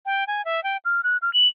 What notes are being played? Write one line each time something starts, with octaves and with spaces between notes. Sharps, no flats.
G5
G#5
E5
G5
F6
F#6
F6
F#7